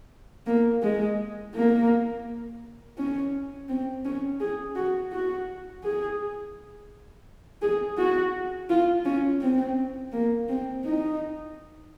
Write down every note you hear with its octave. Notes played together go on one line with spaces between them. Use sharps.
A#3
G#3
A#3
C#4
C4
C#4
G#4
F#4
F#4
G#4
G#4
F#4
F4
C#4
C4
A#3
C4
D#4